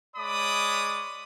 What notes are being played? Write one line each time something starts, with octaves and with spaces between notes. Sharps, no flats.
G#3 C#5 D5 B5 D6 D#6